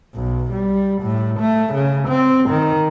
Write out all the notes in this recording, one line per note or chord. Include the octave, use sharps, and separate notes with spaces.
B1
G3
A2
A3
C#3
C4
D#3